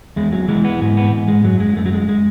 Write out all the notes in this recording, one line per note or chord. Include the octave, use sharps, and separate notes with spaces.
E2 G#3
F#3
E3 G#3
B3
G#2 G#3
B3
G#2
G#3
F#2 F#3
G#3
F#2 A3
F#3
G#3
G#3